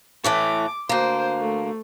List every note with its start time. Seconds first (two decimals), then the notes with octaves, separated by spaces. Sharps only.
0.24 A2 E3 A3 D6
0.89 D2 A#3 C5
1.40 A3